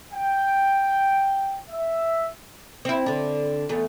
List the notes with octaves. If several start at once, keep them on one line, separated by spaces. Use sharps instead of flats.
G5
E5
C4 E4
D3 D4
E2 A3